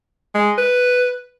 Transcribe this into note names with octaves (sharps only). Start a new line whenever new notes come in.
G#3
B4